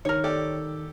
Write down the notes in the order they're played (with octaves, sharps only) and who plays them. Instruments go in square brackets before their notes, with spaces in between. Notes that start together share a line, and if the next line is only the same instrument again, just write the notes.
[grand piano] D#3 [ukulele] A#4 C#5
[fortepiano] G4 A4 D5